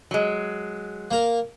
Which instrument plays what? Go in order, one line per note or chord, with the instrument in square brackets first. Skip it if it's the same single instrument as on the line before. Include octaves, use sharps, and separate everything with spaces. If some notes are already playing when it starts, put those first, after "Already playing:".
[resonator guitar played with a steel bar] F#3 G#3
[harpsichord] A#3 A#4